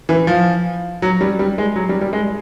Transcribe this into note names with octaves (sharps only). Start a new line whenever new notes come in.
E3
F3
F#3
G3
G3
G#3
F#3
G3
G3
G#3